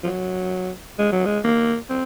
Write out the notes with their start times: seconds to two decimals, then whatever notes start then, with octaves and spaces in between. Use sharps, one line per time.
0.04 F3
0.07 F#3
0.99 G#3
1.12 F#3
1.26 G#3
1.44 A#3
1.90 C4